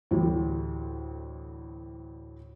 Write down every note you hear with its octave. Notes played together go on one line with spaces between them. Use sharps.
D2 A2 E3 G3